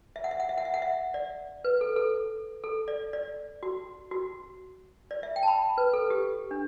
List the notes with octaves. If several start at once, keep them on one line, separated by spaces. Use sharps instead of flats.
E5
F#5
E5
F#5
E5
F#5
E5
F#5
E5
D5
B4
A4
A4
A4
D5
D5
F#4
F#4
D5
E5
G5
A5
B5
B4
A4
G4
D4